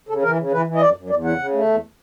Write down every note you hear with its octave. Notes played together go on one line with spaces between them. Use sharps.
C#3 A4
E3 A#4
C#3
E3 B4
E3
D#5
F#2 D5
F#2
E2 D5
C#3 F#5
C#3
A3
E2